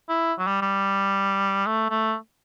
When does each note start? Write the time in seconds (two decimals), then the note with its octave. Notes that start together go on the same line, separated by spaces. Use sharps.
0.09 E4
0.39 F#3
0.47 G3
0.62 G3
1.67 A3
1.90 A3